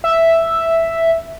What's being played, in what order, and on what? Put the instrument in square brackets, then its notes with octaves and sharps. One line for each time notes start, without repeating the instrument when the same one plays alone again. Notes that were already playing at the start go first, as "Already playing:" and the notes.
[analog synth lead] E5